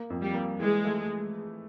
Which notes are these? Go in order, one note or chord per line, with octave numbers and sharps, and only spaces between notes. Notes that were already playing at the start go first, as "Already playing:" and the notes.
Already playing: A#3
F2
G3
A#3
E3 G#3
A3